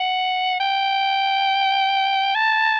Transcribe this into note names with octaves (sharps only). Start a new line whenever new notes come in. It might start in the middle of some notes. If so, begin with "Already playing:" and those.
Already playing: F#5
G5
A5